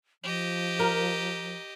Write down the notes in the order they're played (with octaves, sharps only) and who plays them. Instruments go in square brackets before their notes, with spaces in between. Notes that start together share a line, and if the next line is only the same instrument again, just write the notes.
[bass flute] F3 [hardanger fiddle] G4 D#5
[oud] A#4